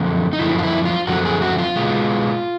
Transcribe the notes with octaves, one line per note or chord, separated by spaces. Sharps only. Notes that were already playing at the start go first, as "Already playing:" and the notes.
Already playing: F#2 D3 F3 A3 C4
D#4
F#2 D3 F3 A3 C4 E4
F4
E4
F4
F#2 D3 F3 A3 C4 F#4
G#4
F#4
F4
B2 G#3 B3